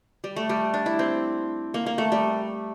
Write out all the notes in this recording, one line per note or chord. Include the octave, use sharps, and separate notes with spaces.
G3
A3
G3
D4
E4
C4
A#3
A#3
A3
G3